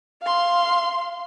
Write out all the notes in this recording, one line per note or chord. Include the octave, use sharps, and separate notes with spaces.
F5 C6